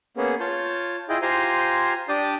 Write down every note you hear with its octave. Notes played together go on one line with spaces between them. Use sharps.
A#3 B3 C#4 G#4
F4 C#5 A5 G6
E4 F4 G#4 D#5 G5
F4 G4 C5 G#5 A#5 C6
D4 G4 D5 A5 D#6 G6